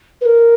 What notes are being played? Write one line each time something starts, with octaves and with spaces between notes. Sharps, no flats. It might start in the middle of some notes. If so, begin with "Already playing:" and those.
B4
A#4